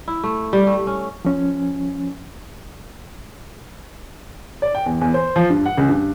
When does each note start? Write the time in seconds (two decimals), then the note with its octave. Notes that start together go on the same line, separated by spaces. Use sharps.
0.08 E4
0.24 A3
0.53 G3
0.67 A3
0.87 C#4
1.25 F3 C#4
4.62 D5
4.75 G5
4.86 E2
5.01 E2
5.14 C5
5.36 F3
5.50 G2
5.66 F#5
5.78 C#2
5.89 G2